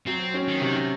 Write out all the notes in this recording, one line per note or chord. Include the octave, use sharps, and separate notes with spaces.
F#3 C4
C#4
D#3
C3